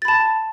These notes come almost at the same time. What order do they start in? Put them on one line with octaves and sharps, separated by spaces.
A6 B5 A5